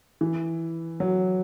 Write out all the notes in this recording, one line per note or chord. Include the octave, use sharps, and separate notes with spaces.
E3
F#3